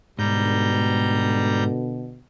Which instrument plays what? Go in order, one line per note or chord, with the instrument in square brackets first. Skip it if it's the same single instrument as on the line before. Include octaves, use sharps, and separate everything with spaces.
[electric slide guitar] G#2 [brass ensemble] B2 D3 [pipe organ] G3 A#5 G6